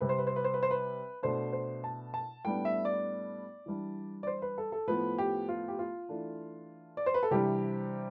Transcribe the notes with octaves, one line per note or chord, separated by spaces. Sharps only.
C3 G3 C4 B4
C5
B4
C5
B4
C5
B4
C5
B4
B2 A3 D4 C5
C5
A5
A5
A2 G3 B3 D4 G5
E5
D5
E3 G3 D4
D5
C5
B4
A4
A4
A2 F3 B3 B4
G4
F4
G4
F4
E3 A3 D4
D5
C5
B4
A4
C3 E3 G3 D4 G4